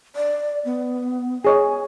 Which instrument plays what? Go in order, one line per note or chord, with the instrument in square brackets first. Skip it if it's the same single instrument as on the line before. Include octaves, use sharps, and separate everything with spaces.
[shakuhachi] D5
B3
[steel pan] G#4 C#5 D#5 [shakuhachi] G#5